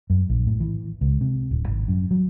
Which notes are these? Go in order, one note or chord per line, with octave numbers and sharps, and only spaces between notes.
F#2
A#1
A2
E3
C#2
C3
D1
G#1
F#2
F#3